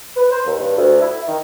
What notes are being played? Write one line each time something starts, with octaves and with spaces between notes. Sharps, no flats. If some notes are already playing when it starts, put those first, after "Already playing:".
B4
C5
D#2
G2
D2
E4
D#3